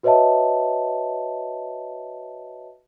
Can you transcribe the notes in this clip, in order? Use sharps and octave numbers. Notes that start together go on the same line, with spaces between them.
F#4 B4 C#5 D#5 E5 A5